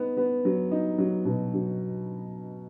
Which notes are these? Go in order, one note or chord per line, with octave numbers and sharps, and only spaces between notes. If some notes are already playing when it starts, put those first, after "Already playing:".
Already playing: B3 D#4
B3
F#3
D#4
F#3
B2
F#3